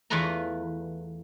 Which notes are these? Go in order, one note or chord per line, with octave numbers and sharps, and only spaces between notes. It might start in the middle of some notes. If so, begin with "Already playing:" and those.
E2 E3 A3 F4 B4 A#5